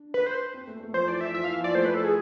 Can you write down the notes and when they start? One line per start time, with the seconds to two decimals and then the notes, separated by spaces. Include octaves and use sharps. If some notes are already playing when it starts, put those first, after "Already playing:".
Already playing: D4
0.14 B4
0.26 C5
0.54 C4
0.67 A3
0.80 A3
0.93 F3 C5
1.08 E3 D5
1.21 E3 E5
1.34 F3 E5
1.44 E3 F5
1.60 F3
1.64 D5
1.75 A3 C5
1.85 B4
1.94 A4
2.04 G#4